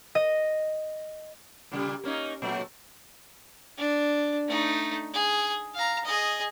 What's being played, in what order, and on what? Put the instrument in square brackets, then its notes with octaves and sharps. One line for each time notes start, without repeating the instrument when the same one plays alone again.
[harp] D#5
[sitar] A#2 C#3 G3
A#3 C#4 D#4
A#2 F#3 A3
[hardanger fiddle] D4
A3 D#4
G#4
F5 A#5
G#4 D#5